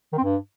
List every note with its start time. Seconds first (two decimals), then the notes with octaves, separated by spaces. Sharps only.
0.13 D#3
0.18 C4
0.24 G2